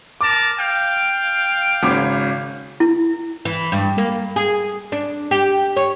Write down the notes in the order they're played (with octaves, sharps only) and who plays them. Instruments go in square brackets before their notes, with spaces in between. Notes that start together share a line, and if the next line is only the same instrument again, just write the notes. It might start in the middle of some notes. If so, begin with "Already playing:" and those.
[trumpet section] A#4 A5 [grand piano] D6
[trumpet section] F5 G5
[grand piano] G#1 C#3 D6
[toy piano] E4
[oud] E3
G2
A#3
G#4
D4
G4
C#5